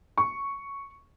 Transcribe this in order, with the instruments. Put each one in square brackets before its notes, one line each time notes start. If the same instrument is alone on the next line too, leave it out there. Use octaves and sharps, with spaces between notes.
[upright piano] C#6